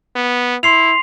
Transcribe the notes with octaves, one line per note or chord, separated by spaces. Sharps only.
B3
E4 C6 C7 F7